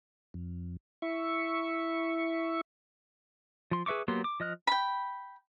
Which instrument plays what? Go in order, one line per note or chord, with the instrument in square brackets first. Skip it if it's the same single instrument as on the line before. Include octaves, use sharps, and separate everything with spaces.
[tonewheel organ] F2
E4 E5 C#6
[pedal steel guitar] F3 C6
G#4 B4 E5 C#6 D6
F#3 A#3 B3 G4 C6
D6
F3 D#5 F6 F#6
[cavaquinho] G5 B5